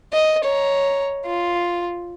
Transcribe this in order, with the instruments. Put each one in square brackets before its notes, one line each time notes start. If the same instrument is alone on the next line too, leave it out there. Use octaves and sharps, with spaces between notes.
[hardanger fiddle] D#5
C#5 A#5
F4